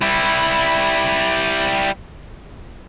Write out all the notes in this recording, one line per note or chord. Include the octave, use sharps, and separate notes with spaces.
G3 E4